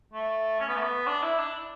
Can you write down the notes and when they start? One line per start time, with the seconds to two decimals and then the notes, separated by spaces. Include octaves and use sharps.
0.13 A3
0.60 C#4
0.68 B3
0.76 A3
0.83 B3
1.07 D4
1.22 E4
1.38 D4